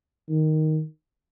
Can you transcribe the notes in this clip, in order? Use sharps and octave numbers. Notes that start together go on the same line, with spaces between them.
D#3